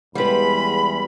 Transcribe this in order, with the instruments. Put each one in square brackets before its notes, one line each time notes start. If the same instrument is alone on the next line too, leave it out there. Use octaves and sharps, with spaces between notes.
[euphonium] E2 [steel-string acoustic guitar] G3 G#3 [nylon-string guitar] B3 B4 [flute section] B5